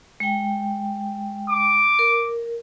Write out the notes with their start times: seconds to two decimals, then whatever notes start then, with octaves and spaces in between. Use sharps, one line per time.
0.20 G#3 G5
1.50 D6
1.99 A#4